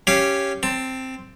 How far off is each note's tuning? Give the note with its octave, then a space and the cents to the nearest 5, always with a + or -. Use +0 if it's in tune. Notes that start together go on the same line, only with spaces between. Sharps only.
C#4 +0 G4 +0 F5 -20
C4 +0 A5 +20